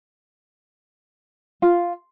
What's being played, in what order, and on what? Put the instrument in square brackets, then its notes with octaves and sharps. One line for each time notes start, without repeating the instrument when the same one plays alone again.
[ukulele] F4